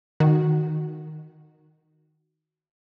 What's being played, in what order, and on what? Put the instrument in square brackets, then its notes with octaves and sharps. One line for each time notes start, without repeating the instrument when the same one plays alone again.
[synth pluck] D#3 F#4